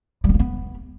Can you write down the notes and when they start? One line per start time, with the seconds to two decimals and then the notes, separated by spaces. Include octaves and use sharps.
0.24 G3
0.29 B3
0.34 A#3
0.39 B3